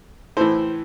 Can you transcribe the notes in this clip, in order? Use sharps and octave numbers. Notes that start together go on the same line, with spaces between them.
A2 E3 C5